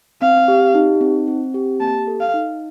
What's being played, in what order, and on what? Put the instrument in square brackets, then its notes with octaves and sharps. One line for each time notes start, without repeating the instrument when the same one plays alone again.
[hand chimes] C4 [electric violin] F5
[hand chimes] G4
D#4
C4
C4
G4
[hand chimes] A#3 [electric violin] A5
[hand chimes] A4
[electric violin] F5
[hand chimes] D#4